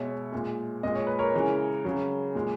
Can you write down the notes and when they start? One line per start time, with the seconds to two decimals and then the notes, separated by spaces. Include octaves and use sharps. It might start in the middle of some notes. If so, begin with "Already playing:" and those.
Already playing: B2 G#3 C#5 E5
0.32 A#2 G#3
0.83 A#2 G#3 D#5
0.95 C#5
1.07 B4
1.19 A#4 C#5
1.34 C#3 E3 G#3
1.85 C#3 F#3
2.35 A#2 G#3